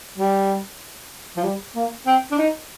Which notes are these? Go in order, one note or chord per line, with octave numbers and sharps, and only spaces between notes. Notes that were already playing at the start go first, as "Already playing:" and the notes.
G3
F3
G3
A#3
C4
D4
D#4